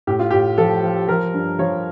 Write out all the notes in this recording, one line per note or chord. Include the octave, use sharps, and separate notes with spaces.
A2 G4
F4
A2 G4
F3 A4
F3
F3 A#4
G2
F3 C#5